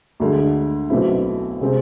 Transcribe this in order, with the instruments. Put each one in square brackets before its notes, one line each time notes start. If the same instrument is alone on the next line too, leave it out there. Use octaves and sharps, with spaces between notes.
[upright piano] D2 D3 G#3
B1 B2 A3 C4 E4
C3 G#3 C4 G#4